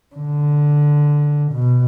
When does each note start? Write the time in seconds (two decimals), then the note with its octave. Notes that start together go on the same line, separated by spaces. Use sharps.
0.15 D3
1.52 B2